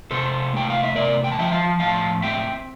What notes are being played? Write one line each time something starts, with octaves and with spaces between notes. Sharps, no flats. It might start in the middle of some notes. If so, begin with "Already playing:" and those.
C3 A4 C5
A3 G5
F5
E5
C3 A#4 D5
G5
A5
F3 E5 G5
F5 A5
A2 F5 A5
C4 E5 G5